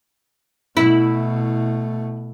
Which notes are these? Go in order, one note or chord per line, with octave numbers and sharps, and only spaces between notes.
B2 A3 E4